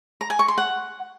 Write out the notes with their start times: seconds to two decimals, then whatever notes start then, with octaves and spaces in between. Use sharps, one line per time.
0.21 A#5
0.30 G#5
0.39 C#6
0.48 C6
0.58 F#5